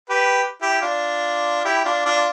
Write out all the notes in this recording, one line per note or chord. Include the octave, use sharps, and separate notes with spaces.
G4 B4
E4 G4
D4 F4
E4 G4
D4 F4
D4 F4